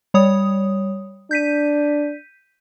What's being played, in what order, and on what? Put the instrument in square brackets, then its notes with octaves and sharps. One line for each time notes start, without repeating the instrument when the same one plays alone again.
[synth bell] G3 C#5 D#6
[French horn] D4 [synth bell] G6 B6 D#7